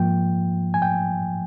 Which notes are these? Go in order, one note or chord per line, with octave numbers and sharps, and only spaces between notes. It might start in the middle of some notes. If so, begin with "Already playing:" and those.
Already playing: G#2 F3 A#3 G5
G#5
G5